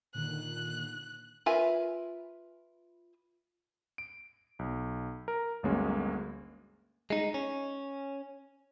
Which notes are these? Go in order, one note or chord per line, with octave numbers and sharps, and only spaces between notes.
A#2 D3 D#3 F#6
F4 A#4 B4 E5 G#5
D7
B1
A#4
G1 D2 F#3 G#3 A#3 C#4
G#3 D#4
C#4